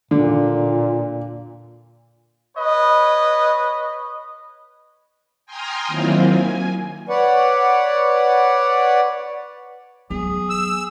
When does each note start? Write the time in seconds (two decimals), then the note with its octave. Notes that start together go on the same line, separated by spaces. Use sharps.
0.11 A#2 D3
2.58 B4 C#5 D#5
5.46 G5 G#5 A#5 C6 D#6 F6
5.87 D#3 F#3 A#3 C4 E4 F4
6.24 G#5
7.09 B4 C#5 D5 F#5
10.10 F#3 B3 G#4
10.50 E6